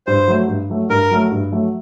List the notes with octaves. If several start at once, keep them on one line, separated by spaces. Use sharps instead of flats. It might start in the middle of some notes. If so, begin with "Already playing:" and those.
G2 C5
F#3 A3
G2
F#3 A3
G2 A#4
F#3 A3
G2
F#3 A3